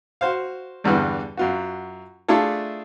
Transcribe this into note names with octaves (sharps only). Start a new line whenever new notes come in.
F#4 C5 F5
E2 G2 D3 E3
F#2 F4 F#4
A3 D4 E4 F4 G#4 A4